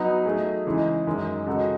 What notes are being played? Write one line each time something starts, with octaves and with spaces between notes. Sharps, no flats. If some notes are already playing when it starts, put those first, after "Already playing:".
Already playing: F#3 B3 D#4
F#3 A3 D#4 G#4
C#3 E3 G#3 D#4 G#4
F#2 D#3 G#3
C#3 G#3 D#4 F#4 A4